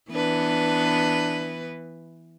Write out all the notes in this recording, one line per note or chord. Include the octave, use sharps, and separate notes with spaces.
E3 B3 D4 B4